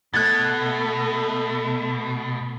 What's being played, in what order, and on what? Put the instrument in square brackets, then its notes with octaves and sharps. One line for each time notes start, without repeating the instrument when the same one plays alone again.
[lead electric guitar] B2 [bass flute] A3 [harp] F#6 G#6 A6